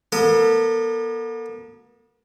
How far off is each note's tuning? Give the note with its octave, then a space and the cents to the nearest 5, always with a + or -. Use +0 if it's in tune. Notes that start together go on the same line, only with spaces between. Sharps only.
B3 -45 A4 +40 D#6 +0